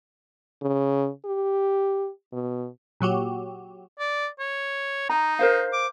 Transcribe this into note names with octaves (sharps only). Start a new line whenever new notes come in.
C#3
G4
B2
A#2 F#3 F#4 G4
D5
C#5
D#4 A#5
A#4 C5 F5
D6